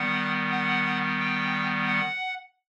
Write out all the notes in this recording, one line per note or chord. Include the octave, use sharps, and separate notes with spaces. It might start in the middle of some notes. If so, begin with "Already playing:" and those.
Already playing: D#3 G3 B3 F#5
F#5
G5
F#5